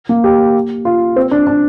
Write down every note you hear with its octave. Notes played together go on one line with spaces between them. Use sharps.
A#3
G4
F4
C4
D4
D4